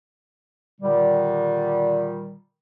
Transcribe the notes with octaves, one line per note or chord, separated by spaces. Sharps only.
A#2 D3 D#3 G3